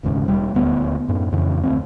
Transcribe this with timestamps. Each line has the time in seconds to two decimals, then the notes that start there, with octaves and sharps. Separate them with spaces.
0.03 E1 D#2 G#2 C#3
0.25 E1 G3
0.54 D#1 D2 B3
1.08 F#2 A2
1.32 F2 A2 C#3 E3
1.63 D2 F#3 C4